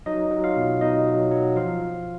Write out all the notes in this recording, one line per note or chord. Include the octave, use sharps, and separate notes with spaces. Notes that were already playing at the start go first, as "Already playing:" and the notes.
F#3 D#4 D#5
F#3
F4 F5
B2
B2 D#4 D#5
F#3
F#3
F3 F4 F5